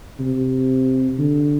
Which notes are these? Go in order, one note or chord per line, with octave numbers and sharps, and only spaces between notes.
C3
D3